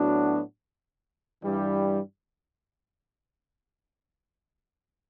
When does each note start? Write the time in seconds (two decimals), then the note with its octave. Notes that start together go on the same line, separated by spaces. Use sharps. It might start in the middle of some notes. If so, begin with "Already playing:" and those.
Already playing: A2 F#3 B3 D4 F#4
1.44 G2 E3 G3